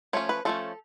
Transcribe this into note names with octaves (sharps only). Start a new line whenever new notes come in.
F3 A3 C#4 C#5
B4
F3 A3 C#4 A4